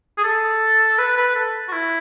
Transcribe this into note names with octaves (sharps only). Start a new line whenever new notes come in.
G#4
A4
B4
B4
A4
F#4
E4